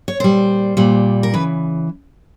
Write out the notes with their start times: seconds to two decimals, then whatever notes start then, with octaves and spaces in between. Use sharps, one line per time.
0.08 C#5
0.20 A#2 G3 C5
0.77 A#2 G3
1.23 A#4
1.34 C#3 E3 B4